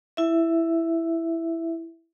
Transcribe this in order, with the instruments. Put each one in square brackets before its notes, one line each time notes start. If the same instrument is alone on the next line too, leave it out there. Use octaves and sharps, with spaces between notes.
[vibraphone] E4 E5